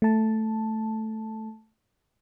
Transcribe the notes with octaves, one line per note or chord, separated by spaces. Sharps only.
A3 A5